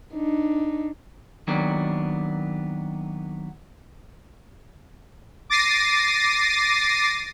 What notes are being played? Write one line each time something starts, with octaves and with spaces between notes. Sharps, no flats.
D4 D#4
D#3 F#3 A#3 B3 D4
D6 A6 A#6 C7 D#7